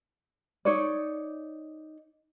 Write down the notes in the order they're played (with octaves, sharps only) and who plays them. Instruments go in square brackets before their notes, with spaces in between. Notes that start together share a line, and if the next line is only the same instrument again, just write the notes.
[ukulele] D#4 C#5 D5